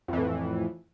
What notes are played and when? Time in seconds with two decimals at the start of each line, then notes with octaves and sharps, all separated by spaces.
0.08 F2
0.13 E3
0.18 A2